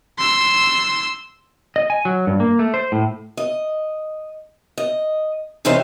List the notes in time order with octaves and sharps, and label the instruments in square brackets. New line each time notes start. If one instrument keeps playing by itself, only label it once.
[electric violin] C6 E6
[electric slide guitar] D#5
G#5
F#3
G2
A#3
A3
C5
A2
[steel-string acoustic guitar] D#5
D#5
C3 E3 C#4 D#4 G4 C5